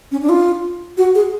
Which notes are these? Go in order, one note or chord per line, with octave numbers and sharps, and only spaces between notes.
C#4
D4
F4
F#4
G#4